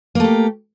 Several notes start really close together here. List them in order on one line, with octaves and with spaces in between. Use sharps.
A#3 A3 G4